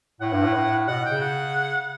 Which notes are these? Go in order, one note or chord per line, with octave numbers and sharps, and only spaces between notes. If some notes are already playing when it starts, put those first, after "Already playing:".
A2 F#5
G2
A2
A2
B2 F#5
C#3 G5
F#5